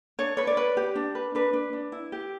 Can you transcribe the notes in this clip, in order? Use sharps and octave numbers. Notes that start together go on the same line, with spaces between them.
D4 C#5
B4 C#5
D5
B4
G4
D4
B4
D4 B4
D4
D4
E4
G4